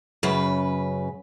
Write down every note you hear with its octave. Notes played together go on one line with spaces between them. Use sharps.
F#2 C#3 B4